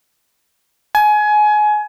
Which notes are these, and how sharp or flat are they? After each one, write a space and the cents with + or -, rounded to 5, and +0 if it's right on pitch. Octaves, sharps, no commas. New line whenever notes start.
G#5 +25